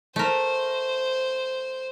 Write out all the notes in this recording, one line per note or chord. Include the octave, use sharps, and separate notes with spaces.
A3 A#4 C5